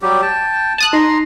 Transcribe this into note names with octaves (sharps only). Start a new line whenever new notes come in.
F#3 G3 G4
G5 A5
A5 D#6 F#6
D#4 A#5 C6